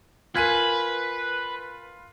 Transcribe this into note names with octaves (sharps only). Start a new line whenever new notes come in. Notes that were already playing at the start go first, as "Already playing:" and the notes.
F4 A#4 B4 G#5 G#6 B6 D#7